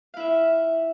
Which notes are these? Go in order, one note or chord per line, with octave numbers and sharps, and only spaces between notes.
E4 E5 F5